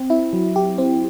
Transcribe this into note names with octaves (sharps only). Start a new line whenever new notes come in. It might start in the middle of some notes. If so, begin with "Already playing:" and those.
Already playing: C4
E4
F#3
G4
C4